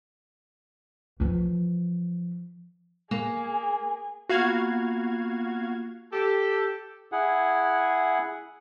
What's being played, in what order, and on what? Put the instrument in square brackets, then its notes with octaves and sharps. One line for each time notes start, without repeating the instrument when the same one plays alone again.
[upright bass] E3 F3
[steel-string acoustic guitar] A#3 [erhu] G#4
[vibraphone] A#3 B3 F4 [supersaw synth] F#4 F5 G#6
[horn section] G4 A4
[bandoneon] E4 G#4 F#5